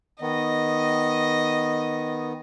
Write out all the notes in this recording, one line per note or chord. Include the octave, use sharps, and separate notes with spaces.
D#3 B3 D#5